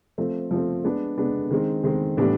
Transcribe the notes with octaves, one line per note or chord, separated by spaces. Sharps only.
F3 A3 C4
F3 A3 C4
G#3 B3 D4
G#3 B3 D4
D#3 G#3 C4
D#3 G#3 C4
A2 E3 G3 B3 D4